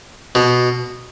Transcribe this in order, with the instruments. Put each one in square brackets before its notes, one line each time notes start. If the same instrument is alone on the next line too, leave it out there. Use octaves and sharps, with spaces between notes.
[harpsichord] B2